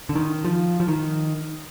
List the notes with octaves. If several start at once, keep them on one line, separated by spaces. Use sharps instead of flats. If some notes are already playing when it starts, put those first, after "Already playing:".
D3
D#3
F3
F3
D#3